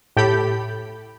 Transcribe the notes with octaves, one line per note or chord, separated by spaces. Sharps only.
A2 G4 A4 B5 G6